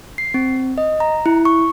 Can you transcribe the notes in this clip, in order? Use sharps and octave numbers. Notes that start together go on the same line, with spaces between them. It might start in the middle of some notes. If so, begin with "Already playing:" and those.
C7
C4
D#5
A#5
E4
C#6